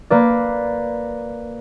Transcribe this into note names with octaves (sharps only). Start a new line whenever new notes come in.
A#3 B4 D5